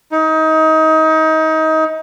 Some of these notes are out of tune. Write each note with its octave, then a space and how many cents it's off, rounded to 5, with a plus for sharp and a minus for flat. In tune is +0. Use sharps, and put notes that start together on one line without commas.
D#4 +25